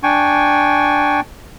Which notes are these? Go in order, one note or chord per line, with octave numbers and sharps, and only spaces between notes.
D4 G5 G#5 C#6